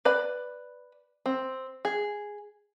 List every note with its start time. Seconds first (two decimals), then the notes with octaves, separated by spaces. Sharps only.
0.05 B4 D5 B5
1.26 C4
1.85 G#4